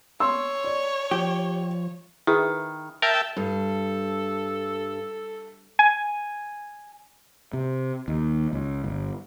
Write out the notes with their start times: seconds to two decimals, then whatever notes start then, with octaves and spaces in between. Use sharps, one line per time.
0.20 C#5 C6 E6
0.64 D5
1.11 F3 G4
2.27 D#3 E4 G#4 B4
3.02 A#4 E5 G5 A5
3.37 G2 A4
5.79 G#5
7.53 C3
8.08 D#2
8.53 C#2
8.84 G1